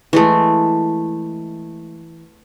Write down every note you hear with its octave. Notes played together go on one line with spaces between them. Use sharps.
E3 G#3 A3